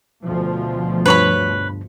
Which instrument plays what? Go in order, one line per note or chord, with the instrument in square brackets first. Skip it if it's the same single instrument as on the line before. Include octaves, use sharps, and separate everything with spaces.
[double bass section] D2 B2 F3
[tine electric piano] G2 [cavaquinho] B4 C#5 B5